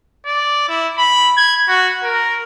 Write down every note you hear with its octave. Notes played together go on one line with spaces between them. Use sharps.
D5
E4
B5
G#6
F#4
A#4